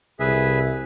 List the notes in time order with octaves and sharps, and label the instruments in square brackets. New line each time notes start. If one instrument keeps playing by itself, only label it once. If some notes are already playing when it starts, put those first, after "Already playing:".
[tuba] C2 [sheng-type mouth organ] G#4 B4 E5